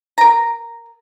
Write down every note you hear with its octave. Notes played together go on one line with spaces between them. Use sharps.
A#4 A#5